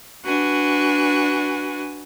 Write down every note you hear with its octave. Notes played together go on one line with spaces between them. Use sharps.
D4 F#4 B4 G#5